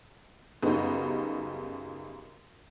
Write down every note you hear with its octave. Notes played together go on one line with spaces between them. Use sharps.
F#2 C#3 G3 B3 D#4